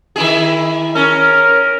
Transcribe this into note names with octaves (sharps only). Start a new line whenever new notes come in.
D#3 E4 G#4
C#4 A#4